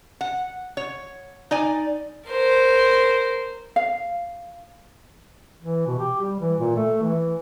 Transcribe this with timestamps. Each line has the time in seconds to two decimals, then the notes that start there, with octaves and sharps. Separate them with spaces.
0.21 F#5
0.77 C#5
1.51 D#4 D5 G#5
2.28 A#4 C5
3.76 F5
5.63 E3
5.87 B2
5.99 G4
6.21 G3
6.40 E3
6.60 A#2
6.76 A3
7.02 E3